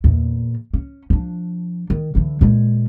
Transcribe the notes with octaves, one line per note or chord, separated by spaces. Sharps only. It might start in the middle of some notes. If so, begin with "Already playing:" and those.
E2 A#2
C#4
F3 D4
D#3
D3 E3
A#2 G#3